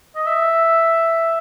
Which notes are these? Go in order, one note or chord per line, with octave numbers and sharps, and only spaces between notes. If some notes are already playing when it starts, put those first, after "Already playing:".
D#5
E5